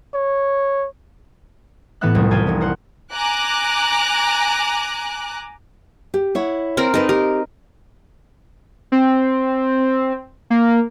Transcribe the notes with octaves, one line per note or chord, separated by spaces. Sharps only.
C#5
A2 E3 B3 E5 F#5 F#6
F#1 C2 F2
E4 F4 A4 G5 G#5
F1 F2
A#4 C5 F#5
G#5 A#5 D6 F#6
G4
E4 C#5 F#5
C4 A#4
D#4 A4 B4 D#5
G4 A#4
C4
A#3